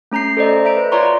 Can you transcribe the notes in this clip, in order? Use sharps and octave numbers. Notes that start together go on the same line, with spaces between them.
A3 C#4 A#5 G6 C7
A4 C5 D5 D#5
E5 A#5 D7
B4
F4 C#5 D5 A#5 C6 C#6
A#5